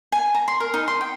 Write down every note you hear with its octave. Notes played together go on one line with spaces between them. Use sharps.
G#5
A#5
C6
A#4
D#4
C6
G5